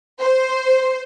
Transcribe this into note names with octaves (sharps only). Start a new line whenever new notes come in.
C5